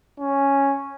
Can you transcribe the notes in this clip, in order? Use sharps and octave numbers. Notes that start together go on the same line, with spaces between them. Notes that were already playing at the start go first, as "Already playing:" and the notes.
C#4